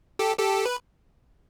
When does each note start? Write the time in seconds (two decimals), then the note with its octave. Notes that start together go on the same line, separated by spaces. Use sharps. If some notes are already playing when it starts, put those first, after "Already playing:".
0.19 G4 A4
0.38 G4 A4
0.66 B4